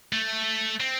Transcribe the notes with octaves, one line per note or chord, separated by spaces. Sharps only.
A3
C4